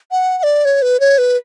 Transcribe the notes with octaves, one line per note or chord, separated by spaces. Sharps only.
F#5
F#5
D5
C#5
B4
C#5
B4